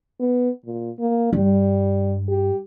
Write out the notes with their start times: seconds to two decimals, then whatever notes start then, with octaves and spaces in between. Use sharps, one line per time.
0.20 B3
0.65 A#2
0.99 A#3
1.33 G2 G3
2.29 G4